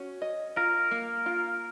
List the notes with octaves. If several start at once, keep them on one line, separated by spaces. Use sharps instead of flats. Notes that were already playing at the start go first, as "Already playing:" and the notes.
Already playing: C#4 F#4
D#5
F4 A#4
A#3
F4